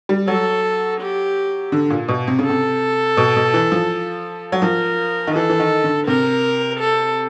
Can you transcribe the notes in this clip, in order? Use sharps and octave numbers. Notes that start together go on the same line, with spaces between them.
G3
F#3 A4
G4
D3
A#2
B2
C3
C#3
C3 A4
B2
B2
E3
F3
F#3
F3 A#4
D#3
E3 A4
E3
D#3
D3
C3 A#4
A4